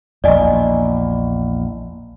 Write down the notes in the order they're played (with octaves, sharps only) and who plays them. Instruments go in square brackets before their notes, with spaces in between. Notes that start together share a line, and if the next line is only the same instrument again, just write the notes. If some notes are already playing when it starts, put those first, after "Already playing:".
[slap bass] A#1 E2 [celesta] D5 D#5 G#5